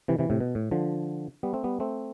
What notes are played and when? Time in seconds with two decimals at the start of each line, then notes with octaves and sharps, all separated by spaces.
0.08 C3 E3
0.19 C3 E3
0.30 A2 C3
0.40 B2
0.55 A2
0.71 D3 F3
1.43 G3 B3
1.54 A3 C4
1.64 G3 B3
1.80 A3 C4